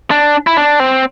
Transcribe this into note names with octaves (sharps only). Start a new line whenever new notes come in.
D4
E4
D4
C4